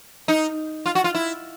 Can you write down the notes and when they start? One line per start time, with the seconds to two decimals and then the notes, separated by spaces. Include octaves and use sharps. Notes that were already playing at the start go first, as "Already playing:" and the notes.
0.28 D#4
0.86 F4
0.95 F#4
1.04 F4
1.15 E4